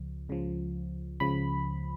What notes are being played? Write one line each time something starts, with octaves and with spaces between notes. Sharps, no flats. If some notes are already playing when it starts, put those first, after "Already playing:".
Already playing: C#2 C#3 F3
C#2 C#3 F3
C#2 C#3 F3 B5